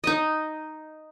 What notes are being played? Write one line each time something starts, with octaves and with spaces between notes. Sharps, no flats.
D#4 D#5